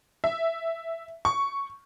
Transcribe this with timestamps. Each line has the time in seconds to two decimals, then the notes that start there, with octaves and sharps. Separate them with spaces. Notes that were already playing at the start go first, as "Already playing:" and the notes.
0.24 E5
1.25 C#6